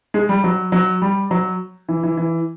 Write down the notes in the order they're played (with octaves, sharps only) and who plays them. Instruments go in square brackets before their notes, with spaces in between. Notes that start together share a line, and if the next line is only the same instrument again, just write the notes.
[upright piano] G#3
G3
F#3
F#3
G3
F#3
E3
E3
E3